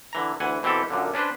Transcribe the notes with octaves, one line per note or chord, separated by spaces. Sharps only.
D3 E3 A#5
D2 E3 F#5 G#5
B2 E3 C4 G4 A4
F#2 A#2 D3
C#4 D4 B4 C5